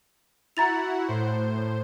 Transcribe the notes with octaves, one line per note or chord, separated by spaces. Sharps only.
E4 F#4 F#5 A#5 A6 F7
A2 C5